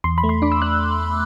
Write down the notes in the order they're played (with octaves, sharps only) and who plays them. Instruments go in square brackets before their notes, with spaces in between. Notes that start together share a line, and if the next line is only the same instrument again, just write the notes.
[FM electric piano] E2 C6
B5
A3
C6
D4 D6
E6
D4 F#6